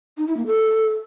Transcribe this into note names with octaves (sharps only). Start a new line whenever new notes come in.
D#4
E4
A#3
A4